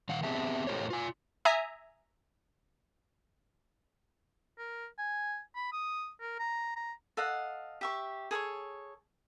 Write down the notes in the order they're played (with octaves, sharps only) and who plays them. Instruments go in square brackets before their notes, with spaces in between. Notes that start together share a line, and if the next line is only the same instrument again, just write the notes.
[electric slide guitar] D#3 F5 F#5
B3 C4 G4 G#4 E5 A5
A2 G4 A4 A#4 C5 C#5
F4 G#5
[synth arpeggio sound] E5 G#5 A#5 D#6
[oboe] A#4
G#5
B5
D#6
A#4
A#5
A#5
[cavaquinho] A4 D#5 F5 F#5
G4 E5 C#6
G#4 A4 C5 C#5